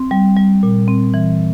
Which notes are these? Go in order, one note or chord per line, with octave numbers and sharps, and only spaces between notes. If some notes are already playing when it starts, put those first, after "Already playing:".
Already playing: C4
G3
G3
A#2
C4
E3